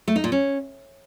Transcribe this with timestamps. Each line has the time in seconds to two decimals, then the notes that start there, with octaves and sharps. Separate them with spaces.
0.08 A3
0.16 D#4
0.24 A#2
0.32 C#4